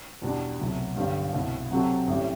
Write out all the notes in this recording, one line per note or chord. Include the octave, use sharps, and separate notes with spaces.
E2 B2 G3 D4
C2 B2 F#3 A3
G1 G2 D3 G3 B3
C2 B2 A3 E4
C3 F#3 C4 F#4 A4
A1 A2 E3 G3